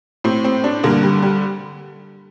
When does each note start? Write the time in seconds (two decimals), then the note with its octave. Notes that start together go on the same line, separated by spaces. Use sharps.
0.24 A2 C4
0.44 C4
0.64 D4
0.83 G2 D3 A#3
1.03 G3
1.22 G3